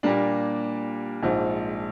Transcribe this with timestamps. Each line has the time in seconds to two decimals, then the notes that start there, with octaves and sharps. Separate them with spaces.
0.03 A#2 G3 A#3 D4
1.23 A#1 G#2 F3